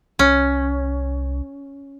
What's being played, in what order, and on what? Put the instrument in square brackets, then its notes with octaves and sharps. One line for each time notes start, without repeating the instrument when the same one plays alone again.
[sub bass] C2 [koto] C#4